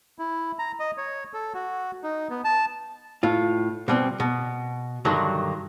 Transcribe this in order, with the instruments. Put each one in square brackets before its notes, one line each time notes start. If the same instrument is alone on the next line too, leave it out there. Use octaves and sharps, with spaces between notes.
[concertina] E4
A#5
D#5
C#5
A4
F#4
D#4
B3
A5
[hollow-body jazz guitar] A2 F4
B2 G3 C4
B2
G2 D3 D#3 F#3